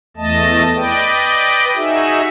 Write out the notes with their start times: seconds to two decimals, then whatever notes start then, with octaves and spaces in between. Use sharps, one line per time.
0.17 E2 A3 D#5 A5
0.76 B4 D5 D#5 G5
1.76 D#4 F#4 G#4 E5